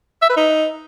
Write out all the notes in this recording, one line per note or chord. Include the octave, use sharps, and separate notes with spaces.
E5
B4
D#4